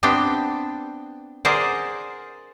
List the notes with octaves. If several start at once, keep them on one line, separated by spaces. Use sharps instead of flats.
B3 C4 D4 G4 G5
G#4 A#4 C5 D5 F#5